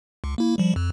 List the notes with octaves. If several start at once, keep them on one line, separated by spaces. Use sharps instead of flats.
C#2
A#3 E4
F3 G3
F2